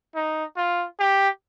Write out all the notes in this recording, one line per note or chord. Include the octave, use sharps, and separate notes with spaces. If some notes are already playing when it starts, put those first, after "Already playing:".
D#4
F4
G4